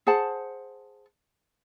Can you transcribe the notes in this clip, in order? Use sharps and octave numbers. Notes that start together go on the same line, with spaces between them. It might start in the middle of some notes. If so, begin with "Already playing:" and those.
G#4 C5 F#5 A5